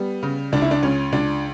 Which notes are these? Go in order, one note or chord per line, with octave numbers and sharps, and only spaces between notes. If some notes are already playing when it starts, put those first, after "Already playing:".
Already playing: G3 B3
C#3
C#2 D4
E4
D4
C#2 C#4
C#2 D4